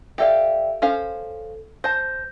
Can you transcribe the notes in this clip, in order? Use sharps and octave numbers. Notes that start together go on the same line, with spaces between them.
G4 A4 D5 E5 F5 G5
C#4 A4 C5 F5
C5 A5 G6 A#6